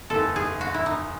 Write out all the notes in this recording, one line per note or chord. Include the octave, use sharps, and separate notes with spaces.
F#1 E2 D#3 A4
G#4
F#4
E4
D#4